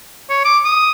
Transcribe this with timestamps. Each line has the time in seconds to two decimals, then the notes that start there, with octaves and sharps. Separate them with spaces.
0.29 C#5
0.45 D6
0.65 D#6